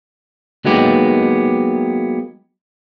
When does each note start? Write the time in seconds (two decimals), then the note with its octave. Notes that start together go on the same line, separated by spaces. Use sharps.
0.65 F#3 G#3 A#3 B3 D#4 G4